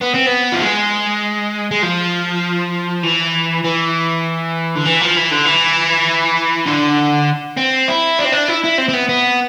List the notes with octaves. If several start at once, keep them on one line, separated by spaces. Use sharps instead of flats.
B3
C4
B3
F3
G#3
G#3
F3
E3
E3
D3
E3
F3
E3
D3
E3
D3
C4
E4
D4
C4
D4
E4
E4
C4
C4
B3
B3